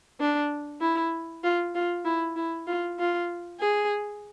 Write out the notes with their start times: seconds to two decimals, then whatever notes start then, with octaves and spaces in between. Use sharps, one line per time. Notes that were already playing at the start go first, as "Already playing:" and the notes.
0.20 D4
0.81 E4
1.44 F4
1.75 F4
2.05 E4
2.36 E4
2.67 F4
2.99 F4
3.60 G#4